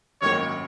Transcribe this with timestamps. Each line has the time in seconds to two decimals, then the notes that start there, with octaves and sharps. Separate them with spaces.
0.22 G#1 F#2 D#3 F#3 A#3 C#5